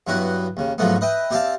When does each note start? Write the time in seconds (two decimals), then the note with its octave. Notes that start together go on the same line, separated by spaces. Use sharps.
0.07 G2 F#3 B3 E4 F#4
0.57 D#2 C#3
0.78 G#2 F3 F#3 A3 B3
1.01 B4 D#5 E5 G5
1.30 C4 G4 D5 E5 F5 A5